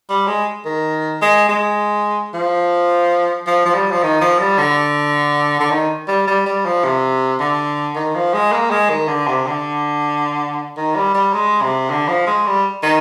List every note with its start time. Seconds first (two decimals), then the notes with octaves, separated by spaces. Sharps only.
0.09 G3
0.27 G#3
0.66 D#3
1.22 G#3
1.49 G#3
2.34 F3
3.47 F3
3.66 F3
3.74 G3
3.92 F3
4.03 D#3
4.21 F3
4.40 G3
4.58 D3
5.60 D3
5.71 D#3
6.08 G3
6.28 G3
6.46 G3
6.65 F3
6.84 C3
7.40 D3
7.96 D#3
8.15 F3
8.33 G#3
8.52 A#3
8.71 G#3
8.90 D#3
9.08 D3
9.28 C3
9.47 D3
10.77 D#3
10.96 G3
11.14 G3
11.34 G#3
11.62 C3
11.90 D3
12.08 F3
12.27 G#3
12.47 G3
12.83 D#3